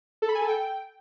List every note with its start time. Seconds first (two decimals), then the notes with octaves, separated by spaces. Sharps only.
0.22 A4
0.28 B5
0.35 G#5
0.41 A4
0.48 G5